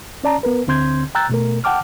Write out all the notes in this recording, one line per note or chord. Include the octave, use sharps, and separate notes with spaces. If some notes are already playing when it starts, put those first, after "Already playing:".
C#4 D5 A5 A#5
B3 A#4 B4
D2 D3 C4 C6 G6 G#6
G5 A#5 E6 F#6 G6 A6
B2 A3 A#4
F#5 G5 A5 D6 F6